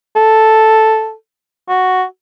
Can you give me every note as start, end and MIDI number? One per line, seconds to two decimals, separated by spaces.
0.16 1.13 69
1.69 2.04 66